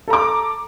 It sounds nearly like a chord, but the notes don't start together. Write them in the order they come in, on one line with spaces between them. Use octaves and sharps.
A4 A#5 D6